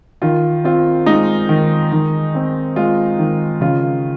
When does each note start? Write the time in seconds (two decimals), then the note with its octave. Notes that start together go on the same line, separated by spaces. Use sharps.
0.22 D#3 F4
0.64 C4 F4
1.06 G#3 D#4
1.49 D#3
1.92 D#3
2.35 C4
2.76 G#3 F4
3.19 D#3
3.61 C#3 F4